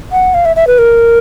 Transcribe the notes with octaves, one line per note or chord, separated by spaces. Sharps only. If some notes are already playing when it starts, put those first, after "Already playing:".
F#5
F5
E5
E5
B4
A#4